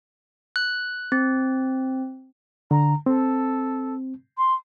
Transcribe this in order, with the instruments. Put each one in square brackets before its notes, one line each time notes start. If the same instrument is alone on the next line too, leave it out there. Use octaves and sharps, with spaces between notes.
[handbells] F#6
C4
[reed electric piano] D3 [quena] A#5
[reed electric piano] C4 [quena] A4
[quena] C6